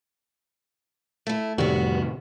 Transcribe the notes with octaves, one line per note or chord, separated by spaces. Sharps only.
A3 E4
F2 A2 C3 D#3 G3 B3 F#4